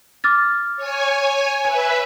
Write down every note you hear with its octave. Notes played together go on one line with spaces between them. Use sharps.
D6 F6 A6
C#5 G#5
B4 E5 G#5